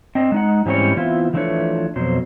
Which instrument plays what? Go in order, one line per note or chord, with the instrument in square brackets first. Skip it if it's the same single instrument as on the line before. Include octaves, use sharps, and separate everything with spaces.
[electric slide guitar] C4 D4 D#5
G#3 D#4 F#5
G#2 E3 G3 C4 C#4 C#5
E3 B3 C4 E4 F4
E3 F3 A3 D4 B4 C#5
F2 B2 F#3 C5